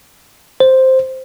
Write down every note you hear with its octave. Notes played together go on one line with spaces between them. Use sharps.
C5